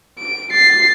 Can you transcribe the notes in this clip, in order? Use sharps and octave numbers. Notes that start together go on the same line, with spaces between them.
D7
A6 C7